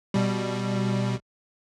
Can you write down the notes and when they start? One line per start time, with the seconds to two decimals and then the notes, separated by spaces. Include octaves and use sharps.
0.14 B2 G3